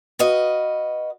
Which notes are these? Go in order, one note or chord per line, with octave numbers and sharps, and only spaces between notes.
F#4 B4 D#5 F5